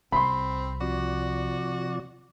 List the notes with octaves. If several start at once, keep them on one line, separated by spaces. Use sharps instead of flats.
C2 C4 B5 C6
C3 F3 F#4 D5